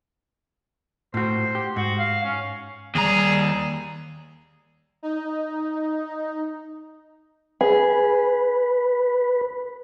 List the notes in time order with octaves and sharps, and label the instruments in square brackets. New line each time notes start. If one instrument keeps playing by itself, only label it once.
[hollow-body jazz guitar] A2 F#4 [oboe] C5
[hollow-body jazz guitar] G4
[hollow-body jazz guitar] G#2 [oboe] F#4
[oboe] F5
C#4
[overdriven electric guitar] D#2 A#5 [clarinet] G3 [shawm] G#4
[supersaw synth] D#4
[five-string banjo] G#4 [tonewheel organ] B4